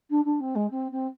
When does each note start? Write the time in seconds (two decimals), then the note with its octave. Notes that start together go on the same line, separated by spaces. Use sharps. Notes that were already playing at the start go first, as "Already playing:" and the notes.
0.10 D4
0.24 D4
0.40 C4
0.55 G#3
0.70 C4
0.91 C4